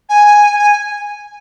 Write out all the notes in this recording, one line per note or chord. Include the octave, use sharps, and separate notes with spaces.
G#5
G#5